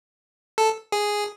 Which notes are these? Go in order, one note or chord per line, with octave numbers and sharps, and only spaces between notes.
A4
G#4